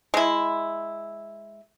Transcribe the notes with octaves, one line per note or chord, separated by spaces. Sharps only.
G#3 E4